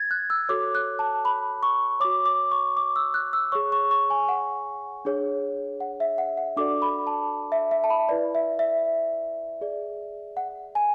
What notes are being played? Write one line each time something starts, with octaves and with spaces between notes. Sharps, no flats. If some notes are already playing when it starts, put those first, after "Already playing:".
Already playing: G#6 A6
F#6
E6
F#4 A4 C#5 D6
F#6
A5
B5
C#6
F#4 C#5 D6
D6
C#6
D6
E6
F#6
E6
G#4 C#5 C#6
C#6
C#6
G#5
F#5
D4 G#4 C#5
F#5
E5
F#5
F#5
D4 F#4 A4 D5 D6
B5
A5
E5
E5
A5
B5
E4 B4 D5
E5
E5
G#4 D5
F#5
G#5